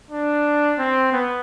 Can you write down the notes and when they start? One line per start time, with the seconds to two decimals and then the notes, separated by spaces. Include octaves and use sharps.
0.11 D4
0.78 C4
1.12 B3